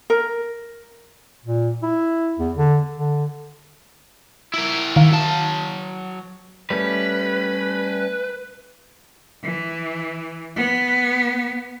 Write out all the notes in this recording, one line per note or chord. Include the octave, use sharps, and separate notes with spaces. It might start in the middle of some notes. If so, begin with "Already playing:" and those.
A#4
A#2
E4
E2
D3
D3
E4 A#4
D#3 F5
F#3 A5
G3 A3 C#4 B4
E3
B3